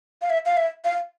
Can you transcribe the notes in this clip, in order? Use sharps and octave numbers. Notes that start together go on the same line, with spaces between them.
F5
E5
F5
E5
F5